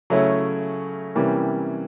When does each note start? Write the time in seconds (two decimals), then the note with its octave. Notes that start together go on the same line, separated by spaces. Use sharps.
0.10 C#3 F#3 A3 C#4 E4
1.15 C3 E3 G3 A#3 C#4